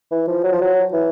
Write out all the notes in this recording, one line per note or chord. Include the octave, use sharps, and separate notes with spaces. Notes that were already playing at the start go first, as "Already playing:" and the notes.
E3
F3
F#3
F3
F#3
E3